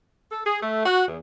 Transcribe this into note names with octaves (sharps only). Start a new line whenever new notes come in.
A4
G#4
A3
F#4
E2